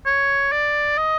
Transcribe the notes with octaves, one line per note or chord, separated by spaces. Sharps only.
C#5
D5
D#5